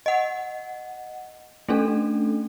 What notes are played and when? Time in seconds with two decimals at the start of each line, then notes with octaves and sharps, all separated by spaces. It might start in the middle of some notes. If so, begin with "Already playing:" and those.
0.06 D#5 F#5
1.69 A3 C#4 D4 A4